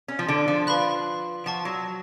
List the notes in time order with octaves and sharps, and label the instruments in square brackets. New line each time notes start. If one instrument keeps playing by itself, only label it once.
[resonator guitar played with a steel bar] C#4
F3
D3
F3
[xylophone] B4 F5 B5 F#6
[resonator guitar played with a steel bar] F3 [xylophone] F#5 A5 C#6
[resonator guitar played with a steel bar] F#3